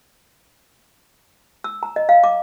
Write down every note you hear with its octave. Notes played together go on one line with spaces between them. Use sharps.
E6
A#5
D#5
F5
D6